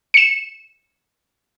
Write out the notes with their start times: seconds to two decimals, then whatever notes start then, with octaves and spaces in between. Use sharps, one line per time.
0.14 C#7 E7